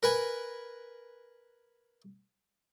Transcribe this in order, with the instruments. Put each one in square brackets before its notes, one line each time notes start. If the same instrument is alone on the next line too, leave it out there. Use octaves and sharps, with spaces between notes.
[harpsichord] A#4 B4 G#5